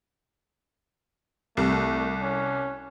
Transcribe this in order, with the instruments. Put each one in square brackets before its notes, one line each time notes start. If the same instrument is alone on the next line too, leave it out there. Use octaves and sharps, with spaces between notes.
[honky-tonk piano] C2 [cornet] A3
[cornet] C#4